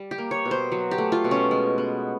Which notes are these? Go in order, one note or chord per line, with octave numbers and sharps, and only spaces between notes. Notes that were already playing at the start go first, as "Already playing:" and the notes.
Already playing: G3
G4
A#3
C#5
B2
C5
F#3
G4
A3
F4
B2
C#4
G#3
B3